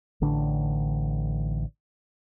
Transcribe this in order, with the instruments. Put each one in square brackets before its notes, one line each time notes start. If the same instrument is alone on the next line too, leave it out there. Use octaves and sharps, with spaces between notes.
[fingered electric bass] A1 D3 D4